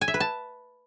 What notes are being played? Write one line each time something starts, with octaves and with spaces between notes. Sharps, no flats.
G#5
E5
B4
A5